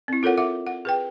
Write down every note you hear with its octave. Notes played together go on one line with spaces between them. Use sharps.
C4 E4
F4 A4 A#4 C#5 F#5
E5 F#5 D6
F#5
G#4 B4 G5